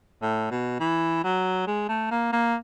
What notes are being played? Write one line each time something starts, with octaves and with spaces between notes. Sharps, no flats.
A2
B2
E3
F#3
G#3
A3
A#3
A#3